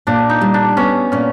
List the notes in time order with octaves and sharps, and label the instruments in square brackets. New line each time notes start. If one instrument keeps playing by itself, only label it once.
[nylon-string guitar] A#2 [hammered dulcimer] D4
[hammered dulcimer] D#4
[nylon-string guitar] G3
[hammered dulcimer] D4
[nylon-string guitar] B3 [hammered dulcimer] C#4
[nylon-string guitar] A#2 [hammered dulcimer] C#4